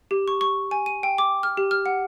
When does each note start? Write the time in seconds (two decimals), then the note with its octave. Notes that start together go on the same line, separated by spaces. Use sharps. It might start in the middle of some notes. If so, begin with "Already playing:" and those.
0.11 G4
0.28 C#6
0.41 C#6
0.71 G#5
0.86 D#7
1.03 G5
1.18 D6
1.43 F6
1.57 G4
1.71 F6
1.86 F#5